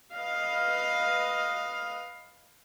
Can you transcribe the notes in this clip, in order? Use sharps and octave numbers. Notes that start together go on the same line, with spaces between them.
B4 D#5 F5